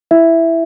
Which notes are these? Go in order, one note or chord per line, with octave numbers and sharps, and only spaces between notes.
E4 E5